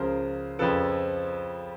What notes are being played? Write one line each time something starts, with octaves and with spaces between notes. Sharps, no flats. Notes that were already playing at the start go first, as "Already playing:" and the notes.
Already playing: C#2 C#3 F3 A#4 C5
F2 C#3 F3 A4 B4